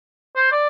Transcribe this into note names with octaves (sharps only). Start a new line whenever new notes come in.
C5
D5